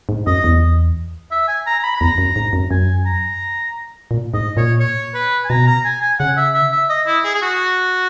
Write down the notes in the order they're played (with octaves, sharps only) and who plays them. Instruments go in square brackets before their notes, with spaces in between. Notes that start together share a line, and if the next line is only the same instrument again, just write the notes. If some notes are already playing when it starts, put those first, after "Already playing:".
[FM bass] G#2
[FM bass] F#2 [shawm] D#5
[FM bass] E2
[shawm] E5
G#5
A#5
A#5
B5
B5
[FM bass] E2 [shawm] A#5
[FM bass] F#2
G#2
F#2
[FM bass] F#2 [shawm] G#5
[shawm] A#5
[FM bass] A#2
[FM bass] G#2 [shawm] D#5
[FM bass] A#2 [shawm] C#5
[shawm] C#5
B4
G#5
[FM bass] B2 [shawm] A#5
[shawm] A#5
G#5
G#5
[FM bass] C#3 [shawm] F#5
[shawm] E5
E5
E5
D#5
E4
G#4
G#4
F#4